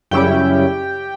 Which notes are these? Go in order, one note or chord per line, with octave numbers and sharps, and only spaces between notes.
F#2 C#3 G3 C#4 E4 G4 G5